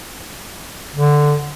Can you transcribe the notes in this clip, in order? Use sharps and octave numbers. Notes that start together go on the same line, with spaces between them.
D3